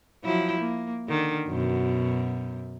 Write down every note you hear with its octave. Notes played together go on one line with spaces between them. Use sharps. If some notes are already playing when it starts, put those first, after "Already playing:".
F3 F#3 E4
A#3
D3 D#3
F#2 B2